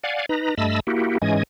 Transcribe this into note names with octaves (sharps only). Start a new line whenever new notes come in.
D5 F5 F#5 G#5
D#4 B4 A#5
G2 A3 D#5 A5 B5 E6
A#3 E4 F#4 G4
G#2 E3 G#3 C#4 D#5 G#5